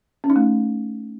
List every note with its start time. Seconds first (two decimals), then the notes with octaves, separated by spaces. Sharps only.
0.24 C#4
0.30 D#4
0.36 A3